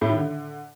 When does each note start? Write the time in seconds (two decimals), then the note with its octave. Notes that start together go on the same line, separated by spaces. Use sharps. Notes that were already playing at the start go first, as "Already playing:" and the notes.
0.01 A2
0.10 D#3
0.18 D3